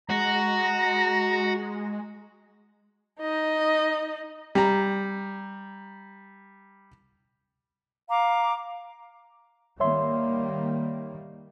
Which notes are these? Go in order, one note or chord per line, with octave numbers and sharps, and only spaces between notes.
G#3 F#4 A#5
D#4 D#5
G3 A#5
F5 A#5 D6
D#3 G3 A#3 C#5 E5 C6